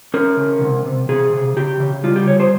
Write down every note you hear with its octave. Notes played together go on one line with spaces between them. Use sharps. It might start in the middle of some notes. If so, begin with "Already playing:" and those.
C#4 A#4
C#3
C3
C3
C3 G#4
C3
C#3 G4
C#3
G3 F4
G4
C#3 C#5
C5